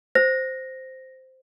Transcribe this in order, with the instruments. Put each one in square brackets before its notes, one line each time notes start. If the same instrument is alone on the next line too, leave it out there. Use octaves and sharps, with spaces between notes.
[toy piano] C5 [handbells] A#6